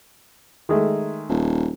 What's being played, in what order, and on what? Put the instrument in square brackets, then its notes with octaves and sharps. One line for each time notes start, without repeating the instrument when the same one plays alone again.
[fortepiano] D#3 G#3 A3
[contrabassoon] D#1